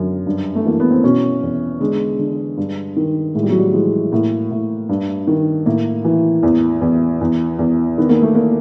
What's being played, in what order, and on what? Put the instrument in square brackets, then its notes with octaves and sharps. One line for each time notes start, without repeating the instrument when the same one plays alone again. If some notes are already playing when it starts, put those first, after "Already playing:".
Already playing: [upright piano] F#2 D3
G2
A3
E3 A#3
B3
C4
B2 C#4
E2
D3 G#3
D3
G2
D#3
A2 G#3
G3
F#3
G3
E3 G#3
A2 A#3
A2
G2
D#3
A2 A#3
E3
E2
E2
E2
E2
D#3 B3
A#3
A3
A#3